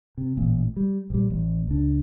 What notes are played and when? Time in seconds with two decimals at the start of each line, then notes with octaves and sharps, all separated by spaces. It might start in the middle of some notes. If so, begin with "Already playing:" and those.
0.18 C3
0.37 A1 A#2
0.76 G3
1.10 A#1 G3
1.30 A1
1.67 C#2 D4